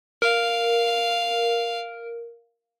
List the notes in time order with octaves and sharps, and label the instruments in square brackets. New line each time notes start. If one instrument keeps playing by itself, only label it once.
[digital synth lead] A#4 [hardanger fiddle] F5